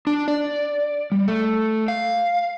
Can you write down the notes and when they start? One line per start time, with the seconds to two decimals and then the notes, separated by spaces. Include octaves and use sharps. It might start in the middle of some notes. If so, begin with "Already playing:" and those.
0.07 D4
0.28 D5
1.12 G3
1.28 A3
1.88 F5